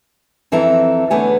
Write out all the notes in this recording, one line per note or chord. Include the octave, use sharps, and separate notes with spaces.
F2 E3 C4 A4 E5 A#5
E2 D3 A3 B3 C#5 G#5